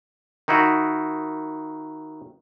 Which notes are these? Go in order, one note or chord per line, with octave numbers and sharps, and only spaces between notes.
D#3 D#4 E4 F#4